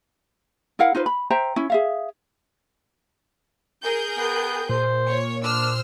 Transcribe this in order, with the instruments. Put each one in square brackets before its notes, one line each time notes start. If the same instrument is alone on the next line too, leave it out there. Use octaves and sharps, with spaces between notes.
[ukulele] E4 A#4 F5 F#5
D#4 F4 B4 C5
B5
C5 E5 G5 A#5
C#4 E4
G#4 E5 F5
[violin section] G#4 A#4 G6
[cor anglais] B3 [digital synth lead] G5
[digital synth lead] A#2 [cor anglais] C5
[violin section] C#5
[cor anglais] D4 [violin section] C5 E6 F6